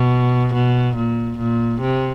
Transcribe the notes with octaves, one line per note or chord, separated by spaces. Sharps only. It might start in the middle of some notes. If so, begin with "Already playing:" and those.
Already playing: B2
B2
A#2
A#2
C3